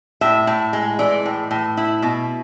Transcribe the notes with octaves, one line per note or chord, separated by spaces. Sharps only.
A2 E5
A2
G#3
E3 D5
A2
A2
E4
B2